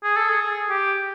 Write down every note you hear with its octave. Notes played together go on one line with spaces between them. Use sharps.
G#4
A4
G#4
G4